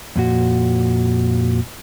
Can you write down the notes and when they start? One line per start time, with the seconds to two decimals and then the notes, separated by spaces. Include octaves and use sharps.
0.16 F2 A#2 F#4